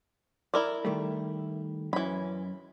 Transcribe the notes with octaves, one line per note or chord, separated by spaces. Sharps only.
E4 A#4 D5
D#3 G3 A3
F#2 E3 C#4 B5